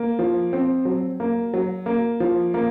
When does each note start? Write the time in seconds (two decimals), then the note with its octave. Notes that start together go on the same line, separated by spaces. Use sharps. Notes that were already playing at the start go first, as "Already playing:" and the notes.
Already playing: A#3
0.19 F3
0.53 C4
0.85 F#3
1.20 A#3
1.54 F#3
1.86 A#3
2.20 F3
2.54 A#3